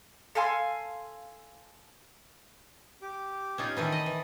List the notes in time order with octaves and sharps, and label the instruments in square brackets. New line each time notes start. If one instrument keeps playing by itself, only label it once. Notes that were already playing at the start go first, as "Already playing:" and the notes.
[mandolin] A4 F5 G#5 C6
[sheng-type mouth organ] G4 D6
[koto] C#4 D#4 F4
[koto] D#3 E3 C4 [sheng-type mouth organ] A5 B5 D#6
[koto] D#5
E3